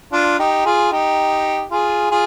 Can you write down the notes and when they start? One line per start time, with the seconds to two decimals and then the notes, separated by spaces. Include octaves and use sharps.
0.12 D4 F4
0.39 D#4 G4
0.65 F4 G#4
0.92 D#4 G4
1.71 F4 G#4
2.11 F4 G#4